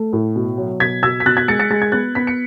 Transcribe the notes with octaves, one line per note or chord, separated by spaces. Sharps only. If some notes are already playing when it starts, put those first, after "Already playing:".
Already playing: A3
A2
B2
F#3
B2 G#6 B6
B2 E6 G#6
B6
B2 F#6 A6
G#6 B6
G#3 A6 C#7
A6 C#7
G#3 A6
G#6
B3 F#6 A6
B3 B6
C#7